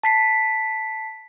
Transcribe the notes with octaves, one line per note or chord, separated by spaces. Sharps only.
A5 B6 C7